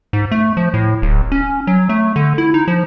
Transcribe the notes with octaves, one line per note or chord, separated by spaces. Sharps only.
G#2
A3
F3
A2
D1
C#4
F#3
A3
D3
E4
D#4
F3